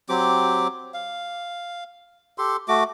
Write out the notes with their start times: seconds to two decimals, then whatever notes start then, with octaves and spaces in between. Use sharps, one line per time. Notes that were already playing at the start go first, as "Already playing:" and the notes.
0.09 F#3 C4 G4 D6
0.94 F5
2.38 G4 A4 C6
2.68 A3 F#4 D6